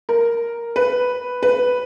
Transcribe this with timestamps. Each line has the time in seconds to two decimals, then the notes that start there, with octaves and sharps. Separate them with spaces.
0.09 A#4
0.76 B4
1.43 B4